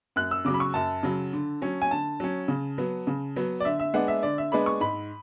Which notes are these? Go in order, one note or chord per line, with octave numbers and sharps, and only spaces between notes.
F#2 F#6
E6
C#3 F#3 D6
B5
C#6
F#2 A5
C#3 F#3
D3
F#3 C#4
G#5
D3 A5
F#3 C#4
C#3
F#3 B3
C#3
F#3 B3
D5
D3 E5
E5
G#3 B3 D4 F#5
E5
D3 D5
E5
G#3 B3 D4 B5
C#6
G#2 B5